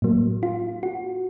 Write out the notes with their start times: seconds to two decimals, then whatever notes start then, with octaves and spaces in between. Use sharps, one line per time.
0.02 A2 F#3 A#3
0.43 F4
0.83 F#4